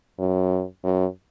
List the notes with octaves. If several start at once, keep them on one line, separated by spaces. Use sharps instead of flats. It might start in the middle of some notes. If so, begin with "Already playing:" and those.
F#2
F#2